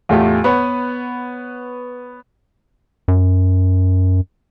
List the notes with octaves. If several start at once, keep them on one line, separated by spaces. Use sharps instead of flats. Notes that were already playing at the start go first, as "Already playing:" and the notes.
E2 A2 A3 F4 G4 A5
B3 B4 C#5 F#5
F#2